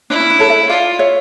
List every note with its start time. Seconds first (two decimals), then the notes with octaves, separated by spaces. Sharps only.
0.10 D4 E4
0.20 C#4
0.30 D4
0.39 A4 C#5
0.50 C#5 E5
0.69 F4 D5 F5
0.99 C#5 E5